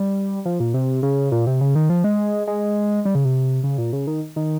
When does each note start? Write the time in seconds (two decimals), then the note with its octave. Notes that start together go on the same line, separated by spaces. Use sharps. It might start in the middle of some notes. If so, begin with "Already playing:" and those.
Already playing: G3
0.45 F3
0.60 A#2
0.74 C3
1.03 C#3
1.32 A#2
1.47 C3
1.61 C#3
1.75 D#3
1.90 F3
2.04 G#3
2.47 G#3
3.05 G3
3.15 C#3
3.25 C3
3.64 C#3
3.78 A#2
3.93 C#3
4.07 D#3
4.36 D#3